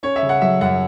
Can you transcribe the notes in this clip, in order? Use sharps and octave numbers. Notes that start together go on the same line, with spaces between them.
C#4 C#5
E5
C#3
F#5
F#3 E5
F#2 F#5